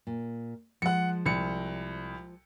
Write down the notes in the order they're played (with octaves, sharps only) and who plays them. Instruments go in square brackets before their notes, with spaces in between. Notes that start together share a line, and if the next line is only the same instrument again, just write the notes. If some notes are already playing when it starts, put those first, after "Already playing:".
[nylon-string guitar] A#2
[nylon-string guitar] F3 G#3 [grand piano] F#5 C#7
[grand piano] C2 C#7